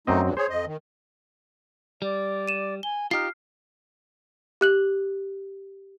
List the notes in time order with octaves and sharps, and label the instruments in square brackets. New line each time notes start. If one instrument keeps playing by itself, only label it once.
[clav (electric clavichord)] F#2 C4 D#5 [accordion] A3 D#4
[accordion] D2 G2 F#3
[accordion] G#4 C#5 [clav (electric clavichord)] C5
[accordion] F2 D#5
D#3
[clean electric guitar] G3 [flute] D5
[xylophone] D#7 E7
[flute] G#5 [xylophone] G7
[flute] D#4 [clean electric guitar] F4 G4 [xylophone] F6 C7
[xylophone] G4 F#6 F#7